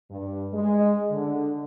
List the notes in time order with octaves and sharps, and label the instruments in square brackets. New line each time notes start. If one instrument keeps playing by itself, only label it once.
[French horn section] G2
G#3
D3